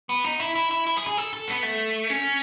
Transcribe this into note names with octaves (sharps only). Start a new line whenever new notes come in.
B3
D#4
E4
E4
E4
E4
G#4
G#4
A4
A4
B3
A3
C#4